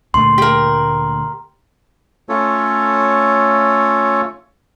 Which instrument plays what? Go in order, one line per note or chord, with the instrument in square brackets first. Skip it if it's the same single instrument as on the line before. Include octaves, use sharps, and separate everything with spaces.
[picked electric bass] D2 A#2 A3 [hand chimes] C6
[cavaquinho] G4 A#4
[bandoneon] A3 C#4 F4 A4 C#5